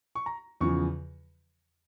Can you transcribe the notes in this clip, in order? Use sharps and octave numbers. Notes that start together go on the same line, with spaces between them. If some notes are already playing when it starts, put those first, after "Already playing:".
C#6
A#5
E2 C#3 F3 C#6